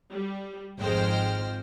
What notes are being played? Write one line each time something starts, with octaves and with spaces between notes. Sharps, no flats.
G3
G#1 F2 G#3 C5 G5 F6